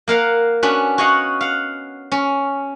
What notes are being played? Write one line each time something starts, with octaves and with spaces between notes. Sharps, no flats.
A#3 A#4 F5 F#5
B3 C#4 D4 F#4
F#4 C#5 D#5 F5 F#5
F5 F#5
C#4